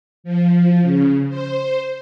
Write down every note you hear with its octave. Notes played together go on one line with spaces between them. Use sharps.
F3
C#3
C5